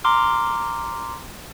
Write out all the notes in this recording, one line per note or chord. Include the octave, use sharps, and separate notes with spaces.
A#5 C6 D6 F6